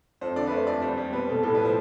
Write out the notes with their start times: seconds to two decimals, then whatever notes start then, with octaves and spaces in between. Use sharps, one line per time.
0.21 F2 C5
0.36 D3 D5
0.47 B4
0.51 A3 C5
0.67 F2 D5
0.82 G3 C5
0.98 G3
1.12 B2 B4
1.29 B2 A4
1.43 A2 A4
1.55 F3 B4
1.65 C5